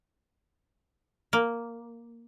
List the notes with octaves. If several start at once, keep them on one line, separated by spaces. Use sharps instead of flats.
A#3